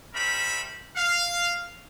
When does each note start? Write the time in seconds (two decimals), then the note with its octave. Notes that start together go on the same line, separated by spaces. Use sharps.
0.14 G3 A3 A#4 C5 E5 B5
0.96 F5